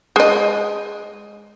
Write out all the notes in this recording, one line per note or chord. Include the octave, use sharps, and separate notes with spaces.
G#3 D#5